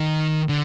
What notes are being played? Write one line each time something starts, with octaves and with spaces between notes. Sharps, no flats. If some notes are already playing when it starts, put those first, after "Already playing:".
Already playing: D#3
D3